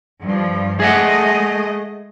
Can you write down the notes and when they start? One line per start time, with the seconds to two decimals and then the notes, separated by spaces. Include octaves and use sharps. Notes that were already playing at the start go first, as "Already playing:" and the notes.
0.22 G2 F3
0.80 G#3 A3 G#4 D#5 E5 F#5